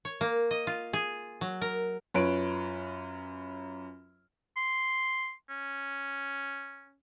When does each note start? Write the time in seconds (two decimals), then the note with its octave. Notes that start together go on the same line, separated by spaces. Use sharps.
0.05 C#5
0.21 A#3
0.51 D#5
0.67 F4
0.93 G#4
1.41 F#3
1.61 A#4
2.14 F#2 F4 B4 C#5 B5 D7
4.57 C6
5.50 C#4